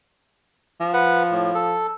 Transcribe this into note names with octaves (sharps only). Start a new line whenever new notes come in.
F3
B4 F#5
A2
A4